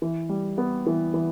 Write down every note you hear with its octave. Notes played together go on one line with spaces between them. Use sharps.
E3
G3
B3
E3
E3